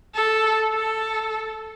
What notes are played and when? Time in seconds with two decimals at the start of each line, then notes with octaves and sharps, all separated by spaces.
0.15 A4
0.74 A4